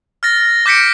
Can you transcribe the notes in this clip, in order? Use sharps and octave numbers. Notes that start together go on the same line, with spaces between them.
F6 A6 A#6
D6 G6 B6 C#7 D7